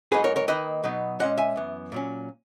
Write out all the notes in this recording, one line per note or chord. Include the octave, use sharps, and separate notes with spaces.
G#2 F#3 B3 D#4 G#4 B4
A#4 C#5
A#4 C#5
D#3 A#3 D#4 B4 D#5
B2 F#3 B3 D#4
A#2 G#3 C#4 D#5 F#5
E5 G#5
F#2 E3 B3
A#2 F#3 C#4